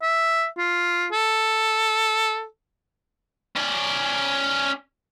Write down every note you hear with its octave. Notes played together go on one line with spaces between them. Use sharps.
E5
F4
A4
C#4 D5